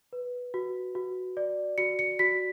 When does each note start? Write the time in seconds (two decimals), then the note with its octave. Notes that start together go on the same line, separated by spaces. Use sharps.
0.13 B4
0.54 F#4
0.95 F#4
1.37 D5
1.78 F#4 C#7
1.99 C#7
2.19 F#4 B6